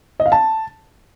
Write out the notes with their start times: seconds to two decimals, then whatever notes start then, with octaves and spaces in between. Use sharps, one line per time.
0.20 D#5
0.26 F5
0.32 A5